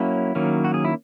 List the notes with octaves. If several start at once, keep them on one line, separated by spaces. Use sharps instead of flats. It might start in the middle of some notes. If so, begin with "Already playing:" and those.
Already playing: F#3 A#3 C#4 E4
D#3 F#3 A#3 C#4
F#4
G#4
E4